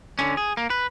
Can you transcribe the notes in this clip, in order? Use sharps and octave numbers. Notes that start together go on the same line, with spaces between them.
D3 C#4
G#4
A#3
B4